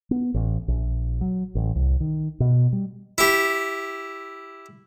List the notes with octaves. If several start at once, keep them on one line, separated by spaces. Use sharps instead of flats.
B3
A1
A#1
F#3
A1
C2
D#3
B2
G3
E4 G4